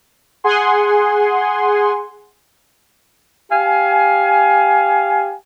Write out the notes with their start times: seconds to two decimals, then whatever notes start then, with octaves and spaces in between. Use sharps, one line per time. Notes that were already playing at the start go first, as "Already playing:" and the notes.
0.44 G#4 F#5 G#5 C6
3.50 G4 F5 G#5